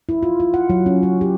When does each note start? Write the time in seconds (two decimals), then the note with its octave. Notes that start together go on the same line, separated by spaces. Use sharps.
0.09 E4
0.23 F4
0.40 F4
0.54 F#5
0.70 F#3
0.86 C#4
1.03 F#4
1.21 G4